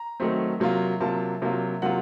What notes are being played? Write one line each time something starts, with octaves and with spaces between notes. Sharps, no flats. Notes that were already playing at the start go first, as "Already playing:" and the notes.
Already playing: A#5
D#3 F#3 A3 C4
C3 F#3 A#3 F4
C3 F#3 A#3 F4 A5
C3 F#3 A#3 F4
C3 F#3 A#3 F4 F#5